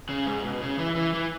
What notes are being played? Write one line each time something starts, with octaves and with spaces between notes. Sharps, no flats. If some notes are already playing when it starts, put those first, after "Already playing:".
C#3
G#2
B2
C#3
E3
E3
E3